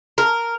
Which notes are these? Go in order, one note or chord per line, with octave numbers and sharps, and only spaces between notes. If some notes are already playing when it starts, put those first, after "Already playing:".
A#4